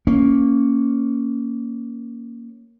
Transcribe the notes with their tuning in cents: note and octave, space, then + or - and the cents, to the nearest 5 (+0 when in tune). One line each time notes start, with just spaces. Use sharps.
A#3 +0 C#4 +0